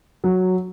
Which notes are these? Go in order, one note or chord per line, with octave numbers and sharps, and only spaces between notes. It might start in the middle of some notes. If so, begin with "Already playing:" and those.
F#3